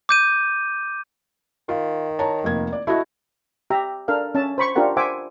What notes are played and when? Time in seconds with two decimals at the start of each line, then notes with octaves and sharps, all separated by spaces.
0.09 D6 G6 D#7
1.69 D#3 F4
2.19 C#5 A5 A#5
2.44 F1 A#3 G#6
2.73 D5
2.87 A3 E4 F#4 D#5
3.70 G4 E5 A#5
4.08 D4 A4 A#4 F5
4.35 C#4 E5 A5
4.58 C5 B5 C#6
4.76 D4 F4 G4 A#4 F#5
4.97 C5 E5 F#5 G#5 D6